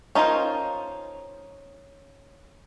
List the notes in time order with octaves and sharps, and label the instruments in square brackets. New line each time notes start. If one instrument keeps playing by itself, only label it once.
[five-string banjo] C#4 D#4 F4 A#4 C5